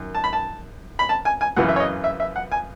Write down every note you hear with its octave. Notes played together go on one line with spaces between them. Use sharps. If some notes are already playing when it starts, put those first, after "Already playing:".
Already playing: F#2 D#3
A5
B5
A5
B5
A5
G#5
G#5
F#2 C#3 E3 F#5
E5
C#5
D#5
E5
E5
F#5
G#5